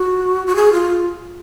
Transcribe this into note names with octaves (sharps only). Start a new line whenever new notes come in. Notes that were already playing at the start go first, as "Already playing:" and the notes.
Already playing: F#4
F#4
G#4
F4